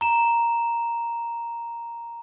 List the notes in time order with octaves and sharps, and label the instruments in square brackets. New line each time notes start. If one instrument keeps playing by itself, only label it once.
[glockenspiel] A#5 E7